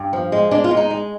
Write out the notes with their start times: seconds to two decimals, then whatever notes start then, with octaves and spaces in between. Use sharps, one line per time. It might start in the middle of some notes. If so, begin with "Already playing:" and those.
Already playing: G2
0.13 F3
0.32 G#3
0.51 G#3 D4
0.64 F4
0.71 G#3
0.77 D#4
0.90 G#3